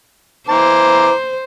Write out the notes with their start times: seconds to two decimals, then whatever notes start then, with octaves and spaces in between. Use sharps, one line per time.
0.49 E3 C5 A#5 D6